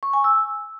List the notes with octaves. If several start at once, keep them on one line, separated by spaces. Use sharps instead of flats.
C#6
G#5
E6